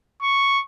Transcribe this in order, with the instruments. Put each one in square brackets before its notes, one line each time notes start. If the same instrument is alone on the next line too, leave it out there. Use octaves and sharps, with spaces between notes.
[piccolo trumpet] C#6